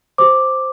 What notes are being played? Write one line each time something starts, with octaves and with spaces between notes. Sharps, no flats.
G4 C5 D6